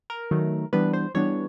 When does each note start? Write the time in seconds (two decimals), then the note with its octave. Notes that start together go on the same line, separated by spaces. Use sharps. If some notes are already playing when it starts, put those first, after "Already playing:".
0.10 A#4
0.31 D#3 F#3 A3
0.73 E3 G3 B3 D4 B4
0.93 C5
1.15 E3 G3 B3 D4 C#5